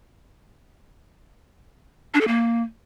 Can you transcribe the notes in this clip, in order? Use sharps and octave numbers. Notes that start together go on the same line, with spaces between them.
D4
A4
A#3